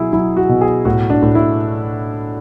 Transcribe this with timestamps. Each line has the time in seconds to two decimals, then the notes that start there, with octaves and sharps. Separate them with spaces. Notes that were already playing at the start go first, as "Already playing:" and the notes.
Already playing: B2 F#3 E4 G#4
0.13 F#3 E4
0.37 F#4
0.49 B2
0.61 G#4
0.85 A2 F#4
1.10 D4
1.23 A2
1.35 E4